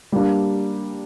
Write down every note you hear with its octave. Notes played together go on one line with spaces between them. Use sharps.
G3 A#3 D4